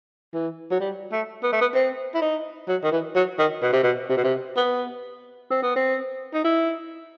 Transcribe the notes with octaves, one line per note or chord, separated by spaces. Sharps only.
E3
F#3
G3
A3
B3
A3
B3
C4
E4
D#4
F#3
D#3
E3
F#3
D#3
B2
C3
B2
C3
B2
C3
B3
C4
B3
C4
D#4
E4